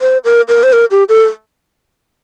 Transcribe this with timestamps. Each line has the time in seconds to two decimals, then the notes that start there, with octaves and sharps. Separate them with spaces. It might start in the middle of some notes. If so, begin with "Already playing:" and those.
0.01 C5
0.25 A#4
0.48 A#4
0.63 C5
0.73 A#4
0.91 G4
1.09 A4